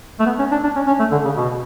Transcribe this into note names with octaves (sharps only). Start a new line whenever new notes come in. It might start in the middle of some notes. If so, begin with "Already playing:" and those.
A3
B3
C#4
D4
D4
C#4
C#4
A3
D3
C#3
B2